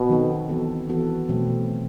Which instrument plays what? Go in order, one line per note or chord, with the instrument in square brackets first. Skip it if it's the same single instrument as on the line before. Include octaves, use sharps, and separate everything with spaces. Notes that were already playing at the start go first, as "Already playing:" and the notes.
Already playing: [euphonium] B2
[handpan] D#3 F#3 C4 D#4 A4
E3 B3 F#4 A4
E3 B3 F#4 A4
B2 F#3 A3 C4